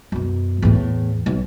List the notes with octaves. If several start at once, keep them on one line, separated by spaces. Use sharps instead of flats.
F#2 B2
E2 A2
B1